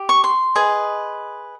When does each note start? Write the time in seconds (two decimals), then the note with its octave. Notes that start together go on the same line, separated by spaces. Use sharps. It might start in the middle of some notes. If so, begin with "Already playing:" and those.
Already playing: G4
0.09 C#6
0.24 C6
0.55 G#4 B4 D#5